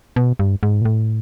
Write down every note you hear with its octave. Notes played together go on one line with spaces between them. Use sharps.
B2
G2
G#2
A#2
A2